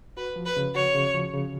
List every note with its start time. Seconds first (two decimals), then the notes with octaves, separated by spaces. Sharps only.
0.17 F#4 B4
0.36 F3
0.46 B4
0.57 C#3
0.75 F#4 C#5
0.95 C#3
1.14 F3
1.33 C#3